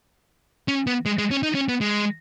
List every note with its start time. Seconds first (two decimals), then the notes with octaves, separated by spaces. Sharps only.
0.68 C#4
0.87 B3
1.06 G#3
1.18 G#3
1.31 C#4
1.43 D#4
1.55 C#4
1.69 B3
1.81 G#3